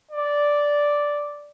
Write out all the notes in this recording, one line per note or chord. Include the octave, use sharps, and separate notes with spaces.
D5